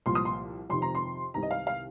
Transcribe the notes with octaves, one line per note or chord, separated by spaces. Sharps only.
C2 A#2 F3 C6
D#6
C6
F2 C3 D#3 C6
A#5
C6
C2 C3 D#3 A#5
D#5
F5
F5